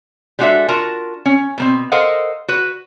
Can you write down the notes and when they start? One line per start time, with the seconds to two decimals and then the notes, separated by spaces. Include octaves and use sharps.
0.39 G3 G#3 D4 F#4 A4 E5
0.68 F4 F#4 A#4 A5
1.26 C#4
1.58 B2 A#3 C4
1.92 A4 A#4 C5 D#5 F5 F#5
2.48 F#4 B4